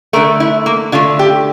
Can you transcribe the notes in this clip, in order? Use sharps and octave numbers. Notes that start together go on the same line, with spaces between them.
D3 A3 A#4
E4
A#3
D3 A3 F4
G4